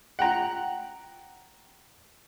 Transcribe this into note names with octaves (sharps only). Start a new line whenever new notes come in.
F#5 G5 A#5